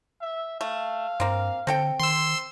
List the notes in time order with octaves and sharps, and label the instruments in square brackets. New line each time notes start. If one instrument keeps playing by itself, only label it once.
[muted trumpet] E5
[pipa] A3 [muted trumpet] F5
[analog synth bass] G2 [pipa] A#3 C4
[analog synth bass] D3 [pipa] C4 A4 G5
[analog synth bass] D#3 [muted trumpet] C5 [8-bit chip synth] C6 E6